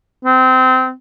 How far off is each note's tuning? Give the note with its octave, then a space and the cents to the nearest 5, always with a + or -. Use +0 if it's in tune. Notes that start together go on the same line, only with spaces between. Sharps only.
C4 -25